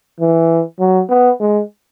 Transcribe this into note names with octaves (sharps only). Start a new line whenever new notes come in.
E3
F#3
B3
G#3